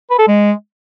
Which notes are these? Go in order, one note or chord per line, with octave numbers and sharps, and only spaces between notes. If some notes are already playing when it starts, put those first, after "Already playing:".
B4
A4
G#3